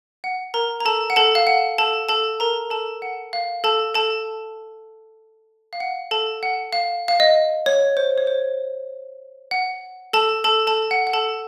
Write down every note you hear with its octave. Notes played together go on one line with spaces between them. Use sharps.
F#5
A#4 A#5
A#5
A4 A5
F#5
A4 A5
F5
F#5
A4 A5
A4 A5
A#4 A#5
A4 A5
F#5
F5
A4 A5
A4 A5
F5
F#5
A4 A5
F#5
F5
F5
D#5
C#5
C5
C#5
C5
F#5
A4 A5
A4 A5
A4 A5
F#5
F#5
A4 A5